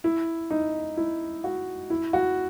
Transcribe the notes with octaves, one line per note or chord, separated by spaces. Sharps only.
E4
D#4
E4
F#4
E4
F#4